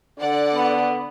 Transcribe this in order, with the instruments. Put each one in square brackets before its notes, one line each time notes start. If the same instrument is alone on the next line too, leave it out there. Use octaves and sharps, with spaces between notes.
[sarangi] D3 [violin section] D5 F#5
[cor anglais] B3